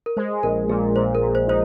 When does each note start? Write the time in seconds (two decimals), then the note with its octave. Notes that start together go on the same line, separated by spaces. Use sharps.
0.06 A#4
0.17 G#3 C5
0.43 A#1 A#4
0.69 A#2 G#4
0.96 A#2 C5
1.15 A#4
1.21 A#2
1.35 C5
1.48 D#4 C5